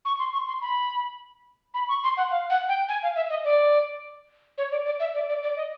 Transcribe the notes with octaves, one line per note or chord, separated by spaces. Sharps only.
C#6
C6
C#6
C6
B5
B5
C#6
C6
F#5
F5
F#5
G5
G#5
F5
E5
D#5
D5
C#5
D5
D5
E5
D5
D5
D5
D#5